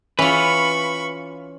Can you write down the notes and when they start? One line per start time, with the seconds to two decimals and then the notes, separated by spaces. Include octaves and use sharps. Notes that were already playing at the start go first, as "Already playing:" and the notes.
0.19 E3 C#4 F4 B4 B5 C#6